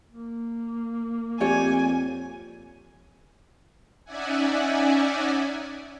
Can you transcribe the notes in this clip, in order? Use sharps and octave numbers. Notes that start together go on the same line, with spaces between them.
A#3
F2 G4 C#5 D5 G#5
C#4 D#4 D5 E5 F#5 G#5